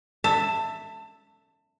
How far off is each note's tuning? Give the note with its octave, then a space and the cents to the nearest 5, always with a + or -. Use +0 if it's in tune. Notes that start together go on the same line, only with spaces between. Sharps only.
E5 +0 A5 +25